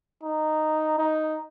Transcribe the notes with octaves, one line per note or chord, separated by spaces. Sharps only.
D#4
D#4